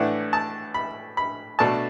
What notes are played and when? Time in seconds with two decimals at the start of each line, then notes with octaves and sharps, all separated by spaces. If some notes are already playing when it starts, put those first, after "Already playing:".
Already playing: A2 E3 A3 D4 F#5
0.33 A5
0.74 B5
1.17 B5
1.59 B2 A3 D4 A5